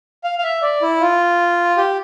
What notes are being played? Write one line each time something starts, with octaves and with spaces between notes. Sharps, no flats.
F5
F5
E5
D5
E4
F4
G4